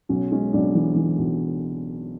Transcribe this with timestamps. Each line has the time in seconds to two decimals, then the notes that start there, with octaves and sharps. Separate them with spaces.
0.09 B1 C#4
0.31 G#3 C#4
0.53 B1 D4
0.75 E3
0.96 E3
1.18 B1